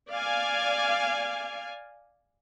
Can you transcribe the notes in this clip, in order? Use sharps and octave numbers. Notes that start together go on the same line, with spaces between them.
D5 F5 G#5